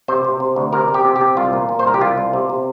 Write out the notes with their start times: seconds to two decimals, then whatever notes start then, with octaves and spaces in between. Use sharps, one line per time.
0.08 C3 C5
0.25 C3
0.40 C3
0.56 D2
0.73 C3 A#4
0.88 C3
0.94 G4
1.05 C3
1.16 G4
1.21 C3
1.37 C2 F4
1.53 A#2
1.69 A#2
1.79 C5
1.85 C2 A#4
1.94 G4
2.01 C2 F4
2.18 C2
2.33 C3
2.50 C3